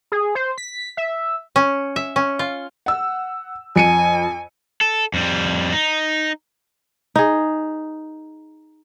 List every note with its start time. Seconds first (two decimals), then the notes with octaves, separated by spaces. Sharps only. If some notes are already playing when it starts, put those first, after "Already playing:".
0.12 G#4
0.35 C5
0.58 B6
0.97 E5
1.56 C#4
1.96 E5
2.16 C#4
2.39 F4
2.86 F#5 E6
3.76 F2 G#5 C#7 D#7
4.81 A4
5.14 F2 G3
5.72 D#4
7.15 D#4 G#4